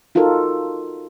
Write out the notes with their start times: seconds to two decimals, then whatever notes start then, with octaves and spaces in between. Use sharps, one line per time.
0.15 D#4 F4 F#4 A4 A#4